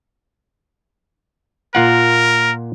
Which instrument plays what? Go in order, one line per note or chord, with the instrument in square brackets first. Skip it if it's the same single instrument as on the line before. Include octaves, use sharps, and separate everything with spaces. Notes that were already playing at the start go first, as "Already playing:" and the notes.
[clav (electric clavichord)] A#2 F4 F#5 [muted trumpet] A#4